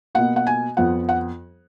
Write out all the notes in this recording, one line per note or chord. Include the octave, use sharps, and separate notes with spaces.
B2 A#3 F#5
F#5
G#5
F2 F3 B3 F#5
F#5